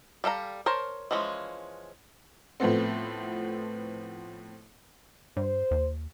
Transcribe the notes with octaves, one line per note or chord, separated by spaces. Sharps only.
G3 A4 F5 A#5
A#4 C5 C#5 A5
E3 F3 G#3 C#4
A2 F3 A3 B3 C4
G2 C5
D#2